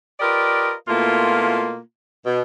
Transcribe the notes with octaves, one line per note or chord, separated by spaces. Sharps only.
F4 G4 A#4 B4 D5 D#5
B2 A3 A#3 E4 F4
B2